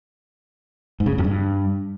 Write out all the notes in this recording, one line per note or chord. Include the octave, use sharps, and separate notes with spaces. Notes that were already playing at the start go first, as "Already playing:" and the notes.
G#2
C#3
G#2
F2
G2